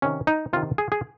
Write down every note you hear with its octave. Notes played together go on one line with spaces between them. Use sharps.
C3 D#3 C#4
D#4
C3 D#3 F4
G#4
G#4